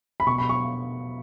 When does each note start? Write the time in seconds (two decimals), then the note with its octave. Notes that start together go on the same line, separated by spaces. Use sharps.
0.20 B5
0.27 B2 C#6
0.38 B5
0.49 C#6